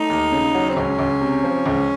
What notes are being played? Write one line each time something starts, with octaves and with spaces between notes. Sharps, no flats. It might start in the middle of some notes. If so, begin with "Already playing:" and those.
Already playing: A3 D#4
D#2
C#3
F#3
C4
C#2 C#4
C#2
C3
F3
C#2